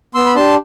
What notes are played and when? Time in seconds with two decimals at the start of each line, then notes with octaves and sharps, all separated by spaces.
0.14 B3 C6 E6
0.26 B5
0.35 D4 G4 A5 C6